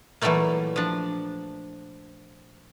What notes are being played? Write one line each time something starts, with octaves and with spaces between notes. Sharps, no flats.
A#2 E3 F#3 G3 A3 A#3
F3 D4